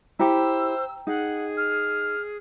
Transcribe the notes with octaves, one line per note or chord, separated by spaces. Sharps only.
E4 G4 C5 G5 A#5 E6
D#4 G#4 F#5
F6